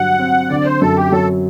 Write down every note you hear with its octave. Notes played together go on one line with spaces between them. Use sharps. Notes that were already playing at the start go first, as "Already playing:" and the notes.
Already playing: G2 D3 F#3 F#5
C4
D3 D5
C5
F#2 A4
G4
F#3 A4